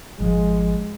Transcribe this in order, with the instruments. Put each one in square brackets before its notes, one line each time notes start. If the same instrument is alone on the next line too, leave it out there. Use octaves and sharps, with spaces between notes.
[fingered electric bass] G#1 F3 [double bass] G#3